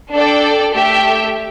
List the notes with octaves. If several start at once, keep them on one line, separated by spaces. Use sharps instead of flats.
D4 A4 D5 G5
A3 G4 E5 G5